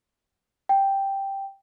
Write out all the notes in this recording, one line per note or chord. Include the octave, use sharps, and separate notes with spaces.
G5